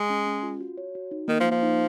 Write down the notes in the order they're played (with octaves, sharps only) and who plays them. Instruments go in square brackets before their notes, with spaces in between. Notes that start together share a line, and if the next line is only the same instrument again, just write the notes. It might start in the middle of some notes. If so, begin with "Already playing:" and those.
Already playing: [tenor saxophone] G#3
[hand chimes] C#4
C#4
F4
F#4
C#5
F#4
D#4
[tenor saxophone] D#3 [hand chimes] A#3
[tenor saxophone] F3
[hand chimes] A#3
[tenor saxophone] F3
[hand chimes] D#4